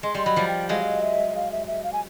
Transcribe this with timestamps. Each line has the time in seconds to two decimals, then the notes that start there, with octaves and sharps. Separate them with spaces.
0.03 G#3 C6
0.15 G3 C6
0.26 F#3 B5
0.36 F3 G3
0.47 G5
0.69 F#3 G#3 F5
1.02 E5
1.35 F5
1.52 E5
1.67 E5
1.83 F5
1.93 G#5